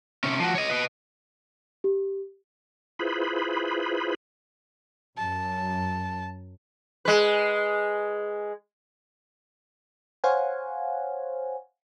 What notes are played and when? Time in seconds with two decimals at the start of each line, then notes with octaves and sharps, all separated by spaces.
0.24 C3 C#4
0.40 F3 F#4
0.55 C#5 D#5
0.70 B4 D#5
1.84 G4
2.99 E4 F4 G#4 B4 C5 B5
5.18 F#2 A5
7.05 G#3 B4
10.24 C5 C#5 F5 F#5 G#5